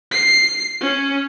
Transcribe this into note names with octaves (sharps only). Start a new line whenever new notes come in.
C7
C#4